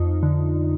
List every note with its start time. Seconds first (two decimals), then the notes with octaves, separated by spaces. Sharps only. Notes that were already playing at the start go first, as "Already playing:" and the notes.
Already playing: F2 D#4 F4
0.23 D3